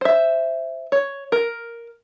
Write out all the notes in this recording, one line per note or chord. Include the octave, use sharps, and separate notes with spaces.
C5 E5
C#5
A#4